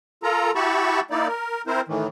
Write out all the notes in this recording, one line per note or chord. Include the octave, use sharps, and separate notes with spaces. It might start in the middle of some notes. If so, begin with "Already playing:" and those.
F4 A4 A#4 A#5
E4 F#4 G4 A5 B5 C#6
A#3 D#4 E4 D5
A#4
C4 E4 A#4 C5
A2 D#3 E3